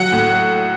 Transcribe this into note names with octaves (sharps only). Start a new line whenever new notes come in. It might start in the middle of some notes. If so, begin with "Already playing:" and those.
Already playing: F#3 F#5
A2